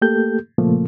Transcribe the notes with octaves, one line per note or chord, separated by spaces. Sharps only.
A3 A#3 G4 A4 G6
A#2 C#3 F3 A3 A#3